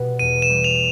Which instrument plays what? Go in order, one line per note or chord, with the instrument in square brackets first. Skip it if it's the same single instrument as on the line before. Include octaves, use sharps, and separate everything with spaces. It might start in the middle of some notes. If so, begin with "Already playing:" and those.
Already playing: [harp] B2 G3 B3
[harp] E2 [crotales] D#7
[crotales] E7
[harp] G3
[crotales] F7